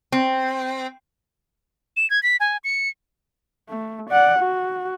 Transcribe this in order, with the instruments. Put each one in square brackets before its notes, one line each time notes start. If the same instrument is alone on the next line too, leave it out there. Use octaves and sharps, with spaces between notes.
[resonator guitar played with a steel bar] C4
[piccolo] E7
G#6
B6
G#5
C#7
[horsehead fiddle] A3
D5 F#5
F#4